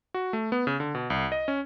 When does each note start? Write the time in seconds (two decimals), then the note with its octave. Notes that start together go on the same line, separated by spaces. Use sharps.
0.14 F#4
0.33 A3
0.52 B3
0.67 C#3
0.80 D3
0.95 B2
1.10 C2
1.32 D#5
1.48 C#4